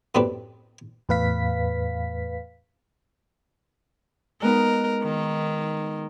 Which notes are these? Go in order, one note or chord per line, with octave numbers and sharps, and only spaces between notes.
F#2 A2 C4 D4 G4 B4
E2 A2 B4 F5 B6
G#3 B3 D#4 A#4
D#3